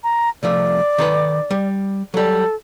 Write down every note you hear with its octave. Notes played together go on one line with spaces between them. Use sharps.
A#5
C2 F3 A3 D5
D#3 A4 B4
G3
F#3 G3 A4